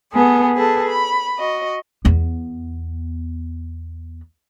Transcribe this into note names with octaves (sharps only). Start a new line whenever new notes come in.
B3 G#4 A4
G#4 A4 B4 A5
B5
F#4 D#5
E2 B3